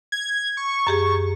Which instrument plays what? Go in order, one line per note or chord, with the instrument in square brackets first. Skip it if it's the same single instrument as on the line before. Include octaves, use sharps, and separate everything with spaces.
[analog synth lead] G#6
C#6
[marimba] F#2 G4 G#4